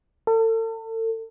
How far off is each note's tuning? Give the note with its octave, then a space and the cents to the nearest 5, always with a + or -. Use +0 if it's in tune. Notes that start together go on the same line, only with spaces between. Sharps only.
A4 +35